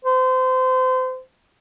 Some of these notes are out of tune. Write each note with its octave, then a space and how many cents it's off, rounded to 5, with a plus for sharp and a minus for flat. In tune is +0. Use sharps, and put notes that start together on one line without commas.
C5 -30